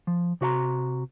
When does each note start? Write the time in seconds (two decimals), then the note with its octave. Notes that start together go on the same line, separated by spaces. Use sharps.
0.07 F3
0.41 C3 F#4 E5 A#5 C6